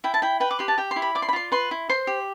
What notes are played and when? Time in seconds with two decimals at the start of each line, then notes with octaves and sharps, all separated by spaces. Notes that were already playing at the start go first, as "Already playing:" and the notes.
0.04 E4 G5
0.14 A5
0.22 E4 G5
0.40 B4 G5
0.51 D6
0.59 G4 C6
0.68 A5
0.78 G4 G5
0.91 C6
0.96 E4
1.02 B5
1.15 D5 D6
1.22 C6
1.29 B5
1.33 F4 C6
1.52 B4 C6
1.71 E4
1.89 C5 C6
2.07 G4